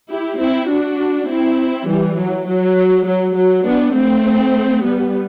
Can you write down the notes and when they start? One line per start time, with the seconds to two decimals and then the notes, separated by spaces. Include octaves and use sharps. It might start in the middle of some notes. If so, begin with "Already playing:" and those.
0.10 E4 G4
0.39 C4 E4
0.69 D4 F#4
1.28 C4 E4
1.87 E3 G3
2.17 F#3
2.47 F#3
3.06 F#3
3.35 F#3
3.65 B3 D4
3.94 A3 C4
4.83 G3 B3